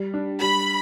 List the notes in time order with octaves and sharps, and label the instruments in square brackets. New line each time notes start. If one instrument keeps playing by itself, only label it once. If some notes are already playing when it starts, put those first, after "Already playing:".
Already playing: [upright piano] G3
D4
[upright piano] G3 [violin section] B5